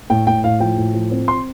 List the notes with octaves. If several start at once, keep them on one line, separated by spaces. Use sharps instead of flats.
A2 G5
A2 G5
A2 F5
F3 G5
A2
F3
C4
C6